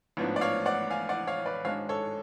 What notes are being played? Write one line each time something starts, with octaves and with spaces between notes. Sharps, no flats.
A1 G#2 F3 B3 D4
D5
C#5 F5
D5 F#5
F5 G#5
D5 F#5
C#5 F5
B4 D5
G#1 G#2 G#3 D4 C#5 F5
A4 C#5